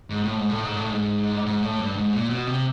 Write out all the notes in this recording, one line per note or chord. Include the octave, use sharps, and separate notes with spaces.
G#2
A2
G#2
A2
G#2
A2
G#2
G#2
A2
G2
G#2
A#2
B2
C3